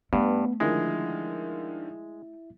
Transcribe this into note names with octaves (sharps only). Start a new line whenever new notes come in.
G2 A3 B3
D3 D#3 F3 G#3 E4 E5